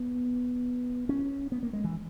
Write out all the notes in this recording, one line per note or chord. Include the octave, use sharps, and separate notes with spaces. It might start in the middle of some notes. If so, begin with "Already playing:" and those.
Already playing: B3
C#4
B3
A#3
G#3
E3